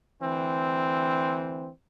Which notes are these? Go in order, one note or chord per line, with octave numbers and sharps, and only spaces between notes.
D2 E3 C4